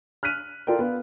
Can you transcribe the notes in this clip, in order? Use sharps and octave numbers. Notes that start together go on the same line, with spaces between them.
F6 F#6 B6 D#7
F4 A4 A#4 D5 G5
B3 B4 F5